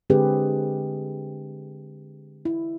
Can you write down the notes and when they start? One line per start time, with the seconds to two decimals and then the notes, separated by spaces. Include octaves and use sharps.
0.10 D3 G#3 C4 G4 G#4 B4
2.45 E4